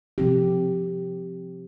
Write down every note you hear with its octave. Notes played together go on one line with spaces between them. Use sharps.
C3 F3 C4 G4